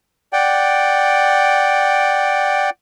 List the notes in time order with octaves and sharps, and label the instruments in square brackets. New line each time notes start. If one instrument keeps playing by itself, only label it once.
[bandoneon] D5 F#5 G5